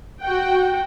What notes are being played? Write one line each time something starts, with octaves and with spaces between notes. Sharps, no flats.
F#4 F#5 G5